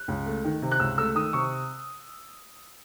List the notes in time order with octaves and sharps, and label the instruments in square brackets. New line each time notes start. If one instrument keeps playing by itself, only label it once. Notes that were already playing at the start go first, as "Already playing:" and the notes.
Already playing: [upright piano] F#6
C#2
A3
D#3
C3
F#6
C#2 E6
A3 E6
D#3 D#6
C3 C#6